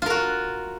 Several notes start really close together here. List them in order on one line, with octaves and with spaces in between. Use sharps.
F4 A#4 F#4